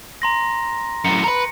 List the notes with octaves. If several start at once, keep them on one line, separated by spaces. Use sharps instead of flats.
A#5 C6 A#6
F#2 A2 C#7
A#4 B4